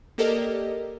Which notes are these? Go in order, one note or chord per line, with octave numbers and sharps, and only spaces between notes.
A#3 G4 A4 A#4 D5 D#5